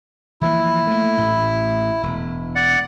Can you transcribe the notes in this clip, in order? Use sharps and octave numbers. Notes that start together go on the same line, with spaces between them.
E3 F3 A#3 E4
A3 A#3
A1 A2
E1
D5 F#5